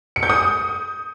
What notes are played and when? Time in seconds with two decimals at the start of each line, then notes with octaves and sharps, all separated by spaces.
0.16 C#7
0.23 G6
0.30 D#6